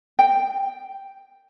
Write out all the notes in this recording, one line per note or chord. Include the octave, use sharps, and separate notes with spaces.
G5